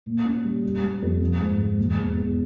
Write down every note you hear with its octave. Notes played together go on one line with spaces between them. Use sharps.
A#2
C#4
G3
G3
G3
F2
F3
G#2
G#2
E1
E2
E2